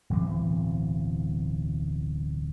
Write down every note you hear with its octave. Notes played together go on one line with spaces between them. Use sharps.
D1 B1 E3 C4